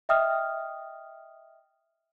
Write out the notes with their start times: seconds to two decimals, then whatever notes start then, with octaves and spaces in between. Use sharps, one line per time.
0.09 D#5 E5 G5 D#6 F6